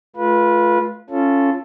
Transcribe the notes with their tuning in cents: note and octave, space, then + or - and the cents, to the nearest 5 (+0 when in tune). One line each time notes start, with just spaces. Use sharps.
A3 -45 F4 +0 B4 -20
C#4 -5 F4 -20 A4 +0